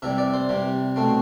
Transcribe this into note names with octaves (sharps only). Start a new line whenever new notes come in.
C3 E3 G3 E5
D5
C5
C3 E3 G3
B2 A3 C4